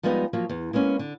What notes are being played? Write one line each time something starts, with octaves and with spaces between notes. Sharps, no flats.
F3 G3 G#3 B3 C#4 D#4
F3 F#3 A#3
E2
G#3 A#3 B3 C#4
D3